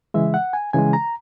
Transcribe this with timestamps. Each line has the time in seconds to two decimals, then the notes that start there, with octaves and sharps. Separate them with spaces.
0.14 C#3 E3 G#3 E5
0.34 F#5
0.53 G#5
0.73 C#3 E3 G#3 G#5
0.93 A#5